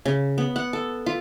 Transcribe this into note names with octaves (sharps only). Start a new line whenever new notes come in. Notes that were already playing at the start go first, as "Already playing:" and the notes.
C#3
B3
F#5
A4
F4